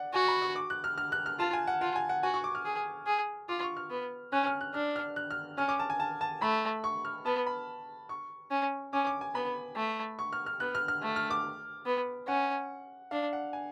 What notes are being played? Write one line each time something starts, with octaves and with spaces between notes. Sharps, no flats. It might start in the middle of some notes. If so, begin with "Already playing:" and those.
Already playing: D5 F#5
F#4 G#5
B5
C#6
D6
F#6
F6
F6
F#6
F6
F4 A5
G#5
F#5
F4 F#5
G#5
F#5
F#4 G#5
C#6
D6
F6
G#4
G#4
F4 D6
C#6
F6
B3
C#4 F#6
F6
F#6
D4 F6
F6
F#6
F6
C#4 F6
D6
A5
G#5
A5
A5
A3 B5
C#6
F6
B3 A5
B5
C#6
C#4
C#4 D6
D6
G#5
B3 B5
A3
C#6
F6
F6
B3 F#6
F6
F6
A3
F6
D6
B3
C#4 F#5
D4 F5
F#5
G#5